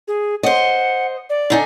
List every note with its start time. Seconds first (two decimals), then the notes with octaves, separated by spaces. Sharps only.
0.08 G#4
0.43 C5 D#5 F#5
1.30 D5
1.50 D3 D#4 G#5